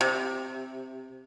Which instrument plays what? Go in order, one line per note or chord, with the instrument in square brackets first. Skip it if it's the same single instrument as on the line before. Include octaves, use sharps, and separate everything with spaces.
[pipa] C3